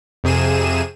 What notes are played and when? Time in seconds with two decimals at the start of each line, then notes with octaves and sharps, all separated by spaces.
0.24 F2 C3 G#4 D#7 E7